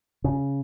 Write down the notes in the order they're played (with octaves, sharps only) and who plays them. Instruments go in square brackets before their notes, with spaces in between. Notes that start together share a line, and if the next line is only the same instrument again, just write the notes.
[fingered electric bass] C#3